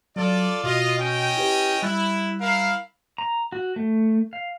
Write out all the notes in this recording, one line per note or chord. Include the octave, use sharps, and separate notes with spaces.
F#3 F4 A4 D5 A6
B2 F4 F#4 D#5
C#4 D#5 G5
E4 G4 B4
G3 E4 F#6 A6
E4 A#4 F5
A#5
F#4
A3
F5